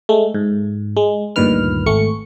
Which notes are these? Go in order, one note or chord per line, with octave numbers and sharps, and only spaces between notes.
G#3 A3
G#2
G#3
D2 G2 A#2 D#3 B4 F6
G#1 A3 C#6 C#7